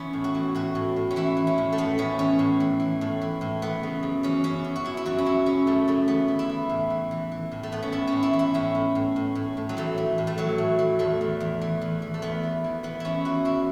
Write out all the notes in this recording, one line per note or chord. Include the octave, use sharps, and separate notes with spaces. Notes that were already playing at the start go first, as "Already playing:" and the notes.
Already playing: E3 B3 C#4
A2
F#4
E3
A2 F#4
A2
A2
C#4
E3 E4
E3
C#4
A2
A3
A2 B3
A2 C#4
E3 C#4
A2
E3
E3
A2
E3
A2
E3 B3
C#3
F#2
E3 C#4
F#2 C#4
F#2
F#4
F#2 E4
E4
F#2 F#4
C#4
F#2 E4
C#3 C#4
F#2 A3
C#3 A3
E3 B3
E3
E4
E3
A2
E3
E3
E3
A2
A3
A2 B3
C#4
A2 E4
A2 C#4
E4
E3
E4
A2 C#4
A2
A2
A2
A2
A2
F#3
E3 A3
E3
A2
A3
E3 F#3
A2
E3
E2 A3
E2
E2
E3
E2
E3
A3
E2 B3
E3
E3
E3 B3
E3 C#4 E4
E3 F#4
E2 E4